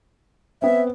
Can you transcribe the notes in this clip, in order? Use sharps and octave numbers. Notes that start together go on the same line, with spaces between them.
B3 C4 E5